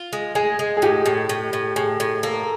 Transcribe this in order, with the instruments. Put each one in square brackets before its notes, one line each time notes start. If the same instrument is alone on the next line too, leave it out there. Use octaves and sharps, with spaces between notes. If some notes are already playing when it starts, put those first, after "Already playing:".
Already playing: [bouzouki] F4
G#3
[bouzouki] G#3 [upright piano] G#4
[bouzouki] G#3
[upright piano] G#4
[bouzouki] A2 [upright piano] G4
[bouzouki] A2
A2
A2
[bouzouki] A2 [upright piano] G#4
[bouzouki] A2
[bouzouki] A#3 [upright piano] A4